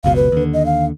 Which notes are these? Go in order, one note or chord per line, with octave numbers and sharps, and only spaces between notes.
F#1 C#2 B2 F5
B4
D#2 D3
D#5
F5